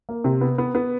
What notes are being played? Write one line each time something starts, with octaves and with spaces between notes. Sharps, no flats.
A#3
C3
B3
B3
B3